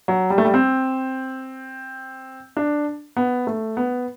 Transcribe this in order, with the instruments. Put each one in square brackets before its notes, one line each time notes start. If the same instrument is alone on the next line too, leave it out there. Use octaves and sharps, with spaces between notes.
[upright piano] F#3
G3
A3
G3
C4
D4
B3
A3
B3